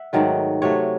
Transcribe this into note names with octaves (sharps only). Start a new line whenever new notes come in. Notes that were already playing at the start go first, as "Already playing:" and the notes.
Already playing: E5 F#5
G#2 D#3 F#3 A3
C3 F#3 A3 C#5